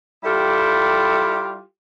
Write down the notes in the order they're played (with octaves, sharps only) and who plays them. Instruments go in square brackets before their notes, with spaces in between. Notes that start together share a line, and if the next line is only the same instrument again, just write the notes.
[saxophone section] G3 E4 F4 G4 A4